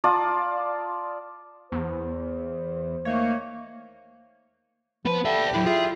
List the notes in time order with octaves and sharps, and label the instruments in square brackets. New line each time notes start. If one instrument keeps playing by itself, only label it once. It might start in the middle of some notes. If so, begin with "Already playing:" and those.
[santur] F4 D5 A5 D#6
[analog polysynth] E2 [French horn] C5
[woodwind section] D#3 A3 A#3 [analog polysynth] C#5
[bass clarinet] F3 [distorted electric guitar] B3 B4 [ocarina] B5
[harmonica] G4 [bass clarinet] A4 [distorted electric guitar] D5 E5
[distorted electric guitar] F#3 D4 [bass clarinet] E4 [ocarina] B5
[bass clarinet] F4 [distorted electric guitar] G#4 [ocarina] E5